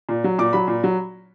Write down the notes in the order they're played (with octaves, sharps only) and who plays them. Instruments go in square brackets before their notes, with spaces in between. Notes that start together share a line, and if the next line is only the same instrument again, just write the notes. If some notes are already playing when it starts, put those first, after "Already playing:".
[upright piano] A#2
F#3
A#2 D6
F#3 B5
A#2
F#3